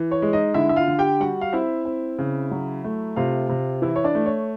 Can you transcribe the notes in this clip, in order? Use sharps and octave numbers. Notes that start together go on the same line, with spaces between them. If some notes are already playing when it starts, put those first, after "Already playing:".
Already playing: E3
C#5
G#3
D#4 D#5
D3 E4 E5
E5
F4 F5
D3
G4 G5
G3 F#4 F#5
F5
C4 E4 E5
C4
C#3
F#3
A3
C3 F4 F5
C3
E3 E4 E5
C#5
D4 D5
A3
C#5